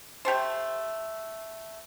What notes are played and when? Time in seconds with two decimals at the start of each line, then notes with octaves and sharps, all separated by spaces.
0.25 A3 G4 A4 C5